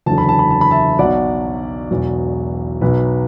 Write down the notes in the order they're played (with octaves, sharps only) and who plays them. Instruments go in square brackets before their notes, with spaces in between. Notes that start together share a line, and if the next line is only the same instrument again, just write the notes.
[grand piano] F#1 E2 D3 F#3 A5
B5
A5
B5
A5
B5
E5 A5
B1 B2 F#3 D5 F#5
E1 E2 B2 F#3
B1 B2 F#3 B4